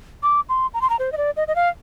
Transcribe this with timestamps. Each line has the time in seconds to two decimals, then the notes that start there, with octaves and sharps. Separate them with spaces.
0.23 D6
0.49 C6
0.74 A#5
0.81 C6
0.90 A#5
0.99 C5
1.12 D#5
1.18 D5
1.37 D#5
1.48 D#5
1.56 F5